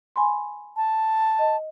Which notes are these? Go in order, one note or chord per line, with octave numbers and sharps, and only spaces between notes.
G#5 B5 C6
A5
D#5